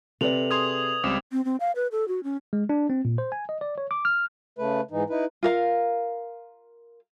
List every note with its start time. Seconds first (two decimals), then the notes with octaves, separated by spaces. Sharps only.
0.21 C3 A4 B4 D5 F7 F#7
0.51 G#4 C6 D#6 G#6 F7
1.04 C#2 G3 C4 D6 E7
1.32 C4
1.45 C4
1.60 F5
1.76 B4
1.92 A4
2.08 F#4
2.24 C#4
2.53 G#3
2.69 D4
2.90 C4
3.05 A#2
3.18 C5
3.32 G#5
3.49 D#5
3.61 D5
3.78 C#5
3.91 D6
4.05 F6
4.58 C#3 A3 B4
4.91 G#2 E3 D#4
5.10 D#4 E4 B4
5.43 F4 A#4 F5